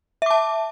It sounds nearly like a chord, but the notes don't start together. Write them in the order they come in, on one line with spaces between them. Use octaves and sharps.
E5 D6 A5